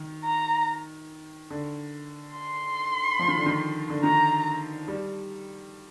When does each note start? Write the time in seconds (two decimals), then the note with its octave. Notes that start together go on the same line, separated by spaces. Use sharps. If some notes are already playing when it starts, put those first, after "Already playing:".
Already playing: D#3
0.24 A#5
1.50 D3
2.35 C6
3.19 F3
3.28 D#3
3.37 D3
3.46 D#3
3.90 D3
4.03 D#3 A#5
4.88 G3